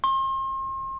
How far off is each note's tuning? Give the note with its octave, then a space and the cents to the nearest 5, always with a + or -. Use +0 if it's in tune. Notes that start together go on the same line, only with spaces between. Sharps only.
C6 +40